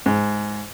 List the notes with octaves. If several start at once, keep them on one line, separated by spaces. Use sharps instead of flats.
G#2